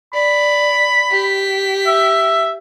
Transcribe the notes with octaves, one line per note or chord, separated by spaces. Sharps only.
D5 B5
G4 B6
E5